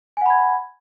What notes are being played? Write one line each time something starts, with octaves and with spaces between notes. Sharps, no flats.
F#5 G#5 B5 G#6